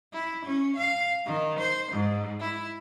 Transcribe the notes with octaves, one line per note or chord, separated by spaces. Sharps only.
E4
C#4
F5
D#3
C5
G#2
E4